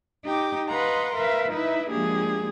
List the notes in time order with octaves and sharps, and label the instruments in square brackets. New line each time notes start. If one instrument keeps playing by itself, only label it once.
[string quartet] D#4 G4 G5 D6
B4 D#5 F5 F#5 A#5 C6
A#4 B4 E5 F5
D#4 E4 B4 E5
F3 G#3 A#3 D4 G4 G#4